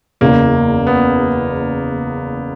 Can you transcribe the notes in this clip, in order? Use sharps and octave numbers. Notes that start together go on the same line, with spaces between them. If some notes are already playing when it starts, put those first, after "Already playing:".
F#1 E2 C#3 A#3
B3